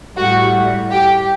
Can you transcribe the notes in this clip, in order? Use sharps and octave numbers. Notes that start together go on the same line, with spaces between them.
A2 G3 F#4
G4